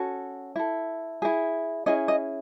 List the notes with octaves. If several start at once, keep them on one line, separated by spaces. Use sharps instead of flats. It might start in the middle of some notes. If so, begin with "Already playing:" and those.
Already playing: C#4 F#4 A4
E4 A4
E4 G#4
C#4 E4 G#4 D#5
D#5